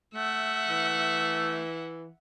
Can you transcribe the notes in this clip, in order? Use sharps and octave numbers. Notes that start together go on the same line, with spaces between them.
A3 E5 F#5
E3